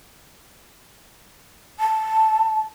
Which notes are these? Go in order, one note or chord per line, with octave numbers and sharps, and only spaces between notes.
A5